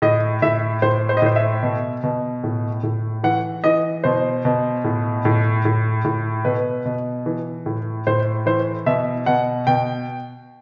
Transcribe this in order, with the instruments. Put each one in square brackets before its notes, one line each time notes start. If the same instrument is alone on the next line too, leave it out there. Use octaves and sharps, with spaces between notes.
[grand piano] A2 D#5
A2 E5
A2 C5
C5
D#5
A2 C5
E5
B2
B2
A2
A2
E3 F#5
E3 D#5
B2 C5
B2
A2
A2
A2
A2
B2 B4
B2
E3
A2
A2 C5
E3 C5
B2 E5
B2 F#5
B2 G5